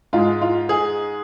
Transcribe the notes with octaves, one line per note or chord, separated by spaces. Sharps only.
G#2 G#3 F4
F4
G#4